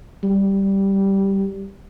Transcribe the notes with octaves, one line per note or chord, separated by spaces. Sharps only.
G3